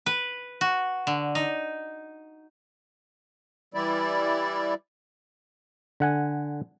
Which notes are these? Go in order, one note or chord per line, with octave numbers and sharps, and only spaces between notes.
B4
F#4
D3
D#4
E3 G3 E4 D5
D3 F#5 G#5